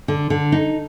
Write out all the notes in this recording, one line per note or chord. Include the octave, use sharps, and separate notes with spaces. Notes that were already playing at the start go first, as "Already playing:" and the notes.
D3
D3
D#4